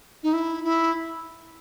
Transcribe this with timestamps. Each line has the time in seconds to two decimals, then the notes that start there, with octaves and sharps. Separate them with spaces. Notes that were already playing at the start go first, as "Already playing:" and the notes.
0.23 D#4
0.33 E4
0.63 E4